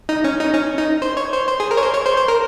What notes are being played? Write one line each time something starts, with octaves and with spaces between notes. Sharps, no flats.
D#4
C#4
D#4
C#4
D#4
C5
C#5
C5
C5
G#4
A#4
C#5
C5
C#5
C5
C5
A#4